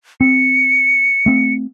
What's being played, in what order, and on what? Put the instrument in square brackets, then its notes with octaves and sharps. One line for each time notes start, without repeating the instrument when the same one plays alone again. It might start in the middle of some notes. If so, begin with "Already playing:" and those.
[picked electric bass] C4 [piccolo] C#7
[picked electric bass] A3 C4